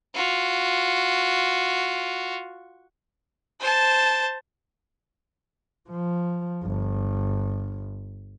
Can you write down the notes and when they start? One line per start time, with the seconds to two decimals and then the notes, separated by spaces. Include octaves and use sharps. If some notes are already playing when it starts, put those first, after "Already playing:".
0.15 F4 F#4
3.60 C5 A5
5.89 F3
6.63 G1